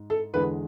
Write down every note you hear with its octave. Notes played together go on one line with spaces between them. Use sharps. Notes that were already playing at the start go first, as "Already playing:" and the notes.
Already playing: G#2
A4
E2 D3 G#3 B4